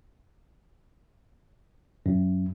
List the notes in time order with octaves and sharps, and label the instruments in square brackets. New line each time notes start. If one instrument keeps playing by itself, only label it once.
[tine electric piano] F#2